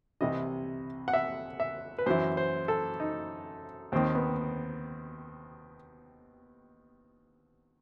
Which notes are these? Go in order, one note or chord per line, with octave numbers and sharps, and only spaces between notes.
C2 C3 E3 D#5
F#5
E5
E5
B4
F#2 E3 C5
C5
A4
D#4
D#2 D#3 C4
B3